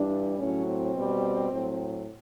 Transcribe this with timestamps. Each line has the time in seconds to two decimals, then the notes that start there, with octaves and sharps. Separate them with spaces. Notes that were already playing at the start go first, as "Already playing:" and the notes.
Already playing: G2 E3 G3 D4
0.38 A2 F#3 C#4
0.66 C4
0.94 B2 G3
1.51 A2 F#3